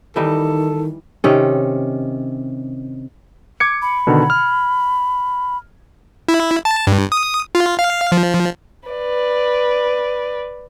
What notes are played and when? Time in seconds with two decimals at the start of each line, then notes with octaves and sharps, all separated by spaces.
0.16 D#3 E3 G3 D#4 A4
1.24 C3 D#3 C#4
3.60 D6 G#6 C#7
3.82 B5
4.07 B2 D3 D#3
4.30 F6
6.28 E4
6.65 A5
6.87 G2
7.12 D#6
7.55 F4
7.79 F5
8.12 F3
8.89 B4 D5